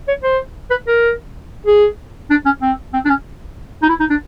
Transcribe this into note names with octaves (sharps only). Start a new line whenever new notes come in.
C#5
C5
B4
A#4
G#4
D4
C#4
C4
C4
D4
C#4
D#4
E4
D#4
D4